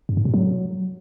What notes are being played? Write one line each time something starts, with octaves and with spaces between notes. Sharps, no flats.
G2
G#2
B2
F#3